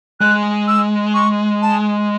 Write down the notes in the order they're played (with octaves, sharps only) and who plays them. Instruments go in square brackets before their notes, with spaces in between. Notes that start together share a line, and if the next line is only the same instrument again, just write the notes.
[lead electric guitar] G#3 [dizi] F#6
[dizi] E6
C#6
A5